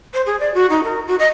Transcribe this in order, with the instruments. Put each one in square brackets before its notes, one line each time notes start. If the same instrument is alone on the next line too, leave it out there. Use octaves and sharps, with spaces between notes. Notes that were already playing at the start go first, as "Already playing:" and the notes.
[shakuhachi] C5
G#4
D5
F#4
D#4
A#4
F#4
D#5